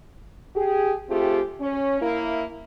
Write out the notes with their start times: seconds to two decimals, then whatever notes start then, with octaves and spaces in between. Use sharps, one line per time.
0.56 G4 G#4
1.09 A3 C4 F4 G4 G#4
1.60 C#4
2.01 A#3 E4